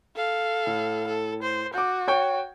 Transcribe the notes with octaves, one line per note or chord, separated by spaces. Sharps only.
A4 F5
A2
A4
C5
F#4 D6 G6
C#5 G5 C#6